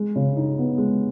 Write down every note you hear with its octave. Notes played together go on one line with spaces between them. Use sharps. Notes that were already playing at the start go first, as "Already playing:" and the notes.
Already playing: G#3
C#3
D#4
B3
G#3